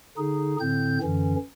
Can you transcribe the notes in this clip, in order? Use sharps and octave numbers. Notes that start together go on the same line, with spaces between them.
D3 D#4 G#4
A2 D3 C4 G6
F#2 D3 E3 C#4